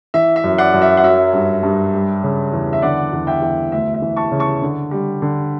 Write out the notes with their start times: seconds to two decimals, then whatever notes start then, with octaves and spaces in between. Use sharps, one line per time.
0.14 E3 E5
0.36 E5
0.44 F#2
0.58 D5 F#5
0.74 F#2
0.82 E5
0.97 F#5
1.04 F#3 E5
1.33 G2
1.63 G2
1.93 G3
2.24 C#3
2.53 E2
2.73 E5
2.82 D3 D5 F#5
3.13 E2
3.27 E5 G5
3.42 E2
3.72 D2 E5
3.94 E5
4.02 E3
4.17 A5 C#6
4.31 C#3
4.40 A5 C#6
4.62 D3
4.91 G3
5.22 D3